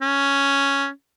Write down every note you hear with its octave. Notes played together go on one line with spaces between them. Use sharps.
C#4